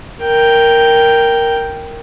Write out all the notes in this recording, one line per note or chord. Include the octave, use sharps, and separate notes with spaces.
A#4 G5